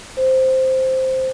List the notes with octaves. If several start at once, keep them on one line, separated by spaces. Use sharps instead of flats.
C5